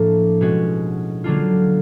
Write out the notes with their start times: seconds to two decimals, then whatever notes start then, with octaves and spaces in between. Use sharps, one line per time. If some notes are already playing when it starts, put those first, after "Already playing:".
Already playing: A2 F3 A#3 D4
0.41 B2 G#3 C#4 F#4
1.24 D3 F#3 A#3 D4 F4